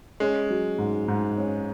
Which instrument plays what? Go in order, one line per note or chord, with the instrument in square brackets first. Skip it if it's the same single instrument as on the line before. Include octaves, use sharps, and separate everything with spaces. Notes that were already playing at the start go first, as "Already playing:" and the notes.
[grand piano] G#3 [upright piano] C#4
[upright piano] F#3
G#2
G#2
C#4